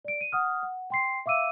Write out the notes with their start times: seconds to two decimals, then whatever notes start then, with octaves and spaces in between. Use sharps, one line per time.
0.05 D5 D7
0.21 D#7
0.32 F#5 D#6 F6
0.63 F#5
0.90 G5 C6 C7
1.26 E5 F5 D6 E6 D#7